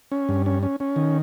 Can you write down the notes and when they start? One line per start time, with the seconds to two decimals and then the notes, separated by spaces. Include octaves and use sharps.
0.12 C#4
0.29 G2
0.46 C#4
0.63 C#4
0.80 C#4
0.96 D#3